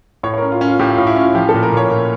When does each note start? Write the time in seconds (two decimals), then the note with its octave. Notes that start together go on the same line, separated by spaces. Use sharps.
0.23 A2 C#5
0.34 C#5
0.38 C#4 A#4
0.52 F4
0.61 C#4
0.68 F4
0.79 A2 G4
0.93 F4
0.98 A2
1.07 E4
1.16 C#4 F4
1.35 F3 G4
1.49 A4
1.54 A#2
1.63 A#4
1.72 A#2 C#5
1.91 A#2